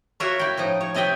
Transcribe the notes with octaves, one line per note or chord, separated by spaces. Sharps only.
F4 F#4 A#4 C#5 E5
E4 G5
A2 F3 D#4
C#5
C3 C4 D#5 E5 G5 G#5